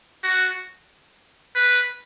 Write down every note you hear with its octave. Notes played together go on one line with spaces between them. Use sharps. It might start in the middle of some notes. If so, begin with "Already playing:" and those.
F#4
B4